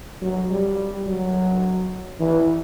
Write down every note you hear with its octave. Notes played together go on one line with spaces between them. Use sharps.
F#3
G3
F#3
E3